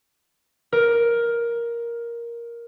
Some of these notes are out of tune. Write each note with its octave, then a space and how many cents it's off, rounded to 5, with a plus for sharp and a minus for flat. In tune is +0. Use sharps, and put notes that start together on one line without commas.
A#4 +10